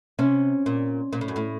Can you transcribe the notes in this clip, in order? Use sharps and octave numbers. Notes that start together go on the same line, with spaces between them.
C3 C#4
A#2
A#2
A2
F#2
A2